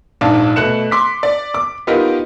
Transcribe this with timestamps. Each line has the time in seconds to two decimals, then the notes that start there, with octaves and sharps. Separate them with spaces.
0.21 A#1 G#2 D4 F5 A5
0.56 B2 A3 F#6 C#7 E7
0.91 C6 D6 B6
1.23 D5
1.54 D6
1.87 B3 D#4 F4 G4 A#4